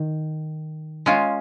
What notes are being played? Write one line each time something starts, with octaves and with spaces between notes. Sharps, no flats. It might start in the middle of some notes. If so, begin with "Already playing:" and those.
Already playing: D#3
G#3 C#4 F4